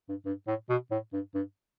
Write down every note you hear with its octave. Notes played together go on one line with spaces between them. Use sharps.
G2
G2
A2
B2
A2
G2
G2